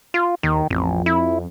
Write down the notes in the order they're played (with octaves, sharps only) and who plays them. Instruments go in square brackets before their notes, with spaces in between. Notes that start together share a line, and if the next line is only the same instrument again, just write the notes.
[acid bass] F4
[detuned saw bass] D#2 [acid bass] D#3
[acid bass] A1 [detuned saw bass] F2
[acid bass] E4